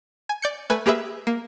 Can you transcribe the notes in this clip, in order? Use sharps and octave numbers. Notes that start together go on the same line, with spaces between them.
G#5
D5 G6 C#7
A3 B4 G#5
A#3 G4 G#4 B4 E5
A#3